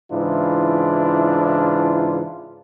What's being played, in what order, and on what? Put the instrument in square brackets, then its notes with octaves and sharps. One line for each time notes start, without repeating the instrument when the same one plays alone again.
[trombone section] G#2 C#3 E3 D4 E4 F4